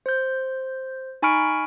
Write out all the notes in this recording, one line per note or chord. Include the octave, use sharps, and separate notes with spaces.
C5 G6
D#4 G#5 B5 C#6 F6 D7